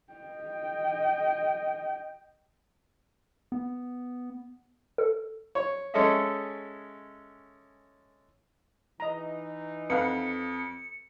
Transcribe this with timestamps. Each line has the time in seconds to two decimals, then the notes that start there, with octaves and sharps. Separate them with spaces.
0.13 D#5 G5
3.52 B3
4.98 A4
5.55 C#5
5.94 G#3 C#4 A4 C#5 D#5 E5
9.00 E3 D#4 D#5 A#5
9.90 F2 B4 F5 F#5 C#7